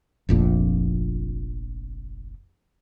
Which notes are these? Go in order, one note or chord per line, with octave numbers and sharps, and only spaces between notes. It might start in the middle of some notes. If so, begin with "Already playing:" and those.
F1 A#1 F2 A#2